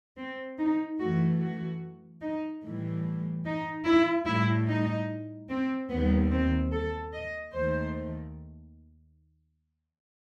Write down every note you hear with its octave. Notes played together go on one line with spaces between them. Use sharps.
C4
D#4
F#2 E3 A3 F#4
F#4
D#4
A2 E3 G3
D#4
E4
A2 G3 E4
D#4
C4
D#2 D#3 G3 B3
C4
A4
D#5
D#2 D#3 A3 C5